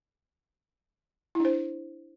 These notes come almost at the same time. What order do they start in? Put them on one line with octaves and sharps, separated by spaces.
E4 D4 C5